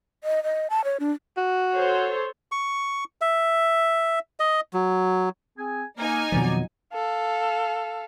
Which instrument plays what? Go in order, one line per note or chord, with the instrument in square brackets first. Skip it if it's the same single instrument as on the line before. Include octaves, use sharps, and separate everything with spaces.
[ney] D#5
D#5
A5
C#5
D4
[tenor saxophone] F#4
[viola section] A4 C5 C#5
[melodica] C#6
E5
D#5
F#3
[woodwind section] C4 G#4 G#5
[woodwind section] A#3 [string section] D#4 G#5
[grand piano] F2 F#3 [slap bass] B2 D#3 F3 [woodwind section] D5
[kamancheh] A4 F5